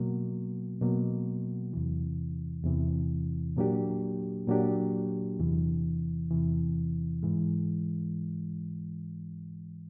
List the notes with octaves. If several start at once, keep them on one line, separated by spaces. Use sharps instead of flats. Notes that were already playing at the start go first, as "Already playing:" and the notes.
Already playing: B2 F#3 A#3
B2 F#3 A#3
E2 C3 E3
E2 C3 E3
A#2 F#3 A#3 D4 G4
A#2 F#3 A#3 D4 G4
E2 C3 E3
E2 C3 E3
G#2 E3 G#3